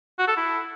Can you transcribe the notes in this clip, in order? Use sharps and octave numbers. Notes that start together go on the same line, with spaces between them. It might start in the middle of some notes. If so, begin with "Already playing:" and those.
F#4
A4
E4